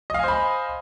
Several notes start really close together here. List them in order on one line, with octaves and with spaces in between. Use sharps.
D#5 F5 G#5 C5 B5